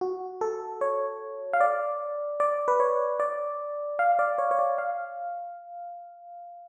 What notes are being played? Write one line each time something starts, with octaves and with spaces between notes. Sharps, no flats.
F#4
A4
C#5
F5
D5
D5
B4
C#5
D5
F5
D5
C#5
C#5
D5
F5